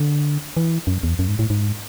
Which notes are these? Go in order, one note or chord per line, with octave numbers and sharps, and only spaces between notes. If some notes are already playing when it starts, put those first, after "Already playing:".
Already playing: D3
E3
F#2
E2
F#2
G#2
A2
G#2